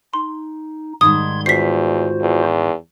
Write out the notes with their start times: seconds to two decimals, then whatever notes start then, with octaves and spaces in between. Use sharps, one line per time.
0.14 D#4 C6
1.01 G#2 D#3 G3 C6 D#6 G#6
1.46 E2 F4 F#4 C5 B6 C7
2.22 E2